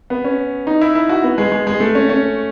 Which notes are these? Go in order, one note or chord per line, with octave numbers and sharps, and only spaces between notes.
B3
C#4
D#4
E4
E4
F#4
B3
G#3
G#3
G#3
A3
C#4
C#4